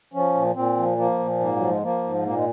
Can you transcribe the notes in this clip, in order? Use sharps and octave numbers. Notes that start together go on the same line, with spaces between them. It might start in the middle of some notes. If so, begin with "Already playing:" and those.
F3 C#4
A#2
A#2 C4
F3
F3 A#3
A#2
G#2 A#3
F#3
F3
G#3
F3 A#3
G#2
A#2 A#3
G#3